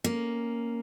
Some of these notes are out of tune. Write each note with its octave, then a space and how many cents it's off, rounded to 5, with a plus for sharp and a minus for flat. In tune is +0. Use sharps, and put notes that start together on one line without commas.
A#3 +0 C#4 +0